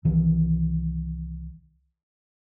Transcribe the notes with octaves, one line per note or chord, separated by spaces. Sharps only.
C2 D#3 E3